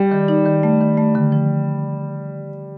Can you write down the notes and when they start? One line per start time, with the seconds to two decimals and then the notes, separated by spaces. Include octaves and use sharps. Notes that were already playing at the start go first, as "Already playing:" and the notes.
Already playing: G3
0.12 D#3
0.28 D#4
0.46 D#3
0.63 A3
0.81 D#3
0.98 A3
1.15 D3
1.32 F3